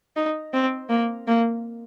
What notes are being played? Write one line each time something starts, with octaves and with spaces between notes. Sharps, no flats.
D#4
C4
A#3
A#3